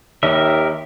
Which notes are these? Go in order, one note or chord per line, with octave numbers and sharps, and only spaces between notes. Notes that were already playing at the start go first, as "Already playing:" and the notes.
D#2 G4 A#4 E5